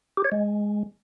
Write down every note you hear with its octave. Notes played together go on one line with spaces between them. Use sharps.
G4
C#5
G#3